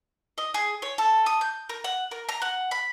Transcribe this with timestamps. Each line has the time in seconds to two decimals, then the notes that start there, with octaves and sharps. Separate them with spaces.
0.38 D#5
0.54 G#4
0.82 C#5
0.98 A4
1.26 D#6
1.41 G6
1.69 A#4
1.84 F#5
2.11 A#4
2.29 A#5
2.42 F#5
2.71 B5